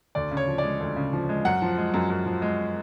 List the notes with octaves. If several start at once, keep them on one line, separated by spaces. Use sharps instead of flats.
D2 D5
C#3
C#5
F3
D5
G#3
D2
C#3
F3
G#3
F#2 F#5
F3
G#3
F#2
F#2
F3
G#3